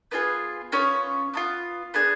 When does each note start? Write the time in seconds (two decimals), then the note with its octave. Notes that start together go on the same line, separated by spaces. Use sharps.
0.11 B3 D4 F4 G#4 B4
0.72 B3 C#4 F4 C#5
1.34 B3 D4 F4
1.94 B3 D4 G#4